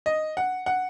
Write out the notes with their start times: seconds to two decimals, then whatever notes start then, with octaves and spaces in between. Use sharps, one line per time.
0.06 D#5
0.37 F#5
0.66 F#5